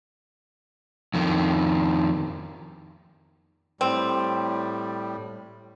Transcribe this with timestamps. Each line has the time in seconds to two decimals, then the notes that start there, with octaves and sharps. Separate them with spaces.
1.14 F2 D#3
3.81 A2 G3 C4